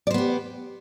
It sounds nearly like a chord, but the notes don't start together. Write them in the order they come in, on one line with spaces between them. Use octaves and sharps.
D5 C5 B3 G4